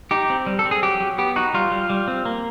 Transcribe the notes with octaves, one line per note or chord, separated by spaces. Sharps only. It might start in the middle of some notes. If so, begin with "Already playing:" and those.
D#4 G4
C4
G3
A4
C4
G#4
F#3 G4
F#3
B3 G4
D#4 F#4
G3 F4
G3
G3
C4
A#3